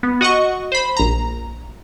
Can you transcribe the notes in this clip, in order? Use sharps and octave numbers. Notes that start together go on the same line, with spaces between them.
B3
F#4 D#5 F#5 C#6
C5 B5
A#1 A#5